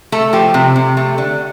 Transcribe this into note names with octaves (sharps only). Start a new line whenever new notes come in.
A3 A4
F3 G4
C3
C3
A3
D3